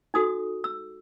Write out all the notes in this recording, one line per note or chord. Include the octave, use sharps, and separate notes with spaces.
D#4 F#4 A4 D#6
E6